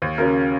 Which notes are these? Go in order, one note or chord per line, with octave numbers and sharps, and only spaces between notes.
D#2
C#3 F#3 C#4 A#4